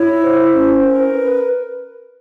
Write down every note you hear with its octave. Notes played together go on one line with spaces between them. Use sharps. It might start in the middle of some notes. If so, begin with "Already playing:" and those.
Already playing: E4 C#5
C5
C#4
A#4
B4